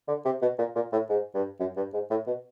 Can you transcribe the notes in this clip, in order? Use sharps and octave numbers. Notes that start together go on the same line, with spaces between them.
D3
C3
B2
A#2
A#2
A2
G#2
G2
F#2
G2
G#2
A2
B2